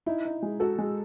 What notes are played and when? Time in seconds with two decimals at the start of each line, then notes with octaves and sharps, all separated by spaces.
0.06 D#4 E4
0.25 D#4
0.43 G#3
0.60 F#4 A4
0.78 G#3